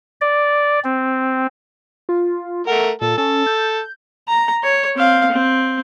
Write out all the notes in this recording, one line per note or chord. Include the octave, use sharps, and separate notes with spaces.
D5
C4
F4
A3 A#4 F#5
A#2 A4
C#4 A4
G6
A#5
C#5
C4 F5
C4